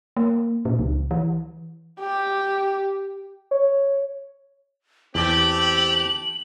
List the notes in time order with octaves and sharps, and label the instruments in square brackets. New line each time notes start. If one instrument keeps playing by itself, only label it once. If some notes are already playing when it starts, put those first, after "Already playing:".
[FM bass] A#3
A#2
C#2
E3
[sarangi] G4
[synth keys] C#5
[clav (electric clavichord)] E2 [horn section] A3 C4 G4 [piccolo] F#7